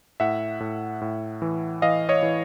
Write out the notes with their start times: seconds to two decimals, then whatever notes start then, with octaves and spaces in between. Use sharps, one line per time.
0.20 A2 E5 F#5
0.60 A2
1.01 A2
1.42 E3
1.82 E3 D#5 F5
2.09 C#5 D#5
2.23 E3